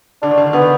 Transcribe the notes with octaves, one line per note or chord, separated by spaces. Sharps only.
D3 D4
D#3
D3
D#3
D3 B3
D#3